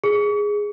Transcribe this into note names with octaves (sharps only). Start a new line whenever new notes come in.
G#4